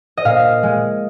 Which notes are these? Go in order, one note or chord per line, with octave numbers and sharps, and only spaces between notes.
D#5
A#2 F5
G#3